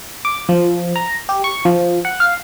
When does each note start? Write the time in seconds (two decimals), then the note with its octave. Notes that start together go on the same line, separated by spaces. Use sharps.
0.25 D6
0.49 F3
0.96 A#5
1.29 G4
1.44 C#6
1.65 F3
2.05 F#5
2.20 F5